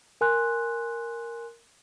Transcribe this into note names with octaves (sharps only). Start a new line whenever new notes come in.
A#4 G#5 C6 F#6